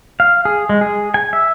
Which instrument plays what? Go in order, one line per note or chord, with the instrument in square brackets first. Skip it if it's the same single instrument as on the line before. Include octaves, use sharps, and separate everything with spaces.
[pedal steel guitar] F5
G#4
G#3
G#4
G#5
E5